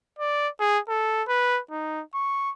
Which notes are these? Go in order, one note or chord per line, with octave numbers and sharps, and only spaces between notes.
D5
G#4
A4
B4
D#4
C#6